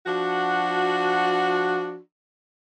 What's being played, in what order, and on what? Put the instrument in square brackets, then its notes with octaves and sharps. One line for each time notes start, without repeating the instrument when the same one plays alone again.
[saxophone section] F3 D4 F#4